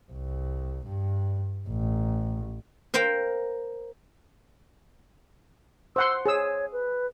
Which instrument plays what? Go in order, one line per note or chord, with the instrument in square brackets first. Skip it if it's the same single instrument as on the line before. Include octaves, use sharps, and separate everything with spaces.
[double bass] C2
G2
A1
[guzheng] A#4 C5 F5 G5
[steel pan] C5 F#5 C6 [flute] E6
[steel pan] G#4 E6 [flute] C#5
[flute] B4